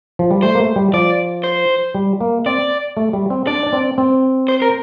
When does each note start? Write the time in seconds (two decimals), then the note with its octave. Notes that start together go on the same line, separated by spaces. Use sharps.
0.19 F3
0.31 G3
0.42 A3 C5
0.55 A#3
0.60 A3
0.76 G3
0.93 F3 D5
1.44 C5
1.95 G3
2.21 A#3
2.46 C4 D5
2.97 A3
3.13 G3
3.30 C4
3.47 D4 D5
3.66 D4
3.73 C4
3.98 C4
4.48 C5
4.62 A#4